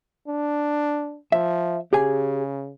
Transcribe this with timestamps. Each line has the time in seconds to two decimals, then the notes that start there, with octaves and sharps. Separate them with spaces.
0.27 D4
1.32 F3 E5
1.93 C#3 G4 G#4 G#5